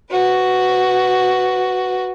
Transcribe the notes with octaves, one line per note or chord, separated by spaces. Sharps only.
F#4 B4